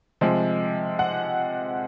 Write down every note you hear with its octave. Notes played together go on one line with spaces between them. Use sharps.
C3 F3 G#3
F#5